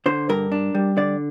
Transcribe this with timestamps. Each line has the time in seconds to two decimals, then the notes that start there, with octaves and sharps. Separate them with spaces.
0.06 D3 C5
0.29 G2 A#4
0.52 D4
0.75 G3
0.97 D3 D5